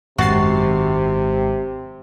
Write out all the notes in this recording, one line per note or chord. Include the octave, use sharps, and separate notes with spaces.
G#1 F#2 C3 D#3 G#3 F#4 A6 C7